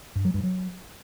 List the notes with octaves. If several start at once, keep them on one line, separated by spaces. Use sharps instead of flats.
G2
F#3
G2
F#3